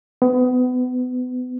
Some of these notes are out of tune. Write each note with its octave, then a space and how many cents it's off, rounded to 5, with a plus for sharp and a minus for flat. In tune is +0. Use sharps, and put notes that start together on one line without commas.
B3 +30